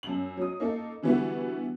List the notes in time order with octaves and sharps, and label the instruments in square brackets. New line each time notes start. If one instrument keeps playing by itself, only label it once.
[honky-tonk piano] F#2 F#7
F#3 D#6
A#3 D#4 A4
D3 E3 G3 B3 E4 F#4